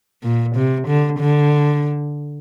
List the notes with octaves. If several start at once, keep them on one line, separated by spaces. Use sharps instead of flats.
A#2
C3
D3
D3